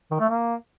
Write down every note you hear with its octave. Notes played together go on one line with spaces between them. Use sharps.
D#3
A3
A#3